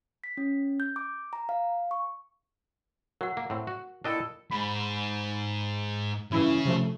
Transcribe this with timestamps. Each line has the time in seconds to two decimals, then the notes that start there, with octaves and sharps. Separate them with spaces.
0.24 B6
0.37 C#4
0.80 G6
0.96 D6
1.33 A#5
1.49 F5
1.91 C#6
3.21 F#3 A#4 F#5
3.37 A#3
3.50 A2 C4
3.67 F#4
4.04 A#2 D4 E4 A4 D#5 G5
4.51 G#2 B5
6.32 G2 C#3 E3 E4
6.65 C3 F3 A3